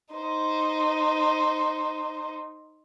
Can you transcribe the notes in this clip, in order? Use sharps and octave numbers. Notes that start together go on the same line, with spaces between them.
D#4 C5